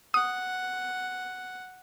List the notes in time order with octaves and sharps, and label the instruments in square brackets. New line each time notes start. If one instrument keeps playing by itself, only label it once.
[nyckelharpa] F#5 [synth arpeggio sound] D#6